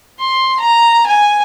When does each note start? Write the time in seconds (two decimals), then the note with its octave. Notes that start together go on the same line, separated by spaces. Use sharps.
0.20 C6
0.60 A#5
1.06 G#5